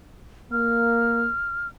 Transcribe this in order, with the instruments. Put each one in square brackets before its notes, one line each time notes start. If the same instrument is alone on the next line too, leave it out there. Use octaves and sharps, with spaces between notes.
[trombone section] A#3 [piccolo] F6